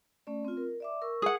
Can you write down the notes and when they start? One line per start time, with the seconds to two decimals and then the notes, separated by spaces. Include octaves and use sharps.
0.27 A3 C#4 D5
0.45 C4 F4
0.57 A#4
0.80 D5 E5 D6
1.02 A#4 C#6 E6
1.22 G#4 F#5